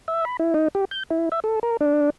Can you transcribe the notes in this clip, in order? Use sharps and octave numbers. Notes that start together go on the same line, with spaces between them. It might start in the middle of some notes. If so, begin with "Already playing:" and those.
E5
B5
E4
D#4
G4
G6
E4
E5
A4
A#4
D4